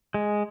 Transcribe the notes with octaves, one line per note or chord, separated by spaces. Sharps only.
G#3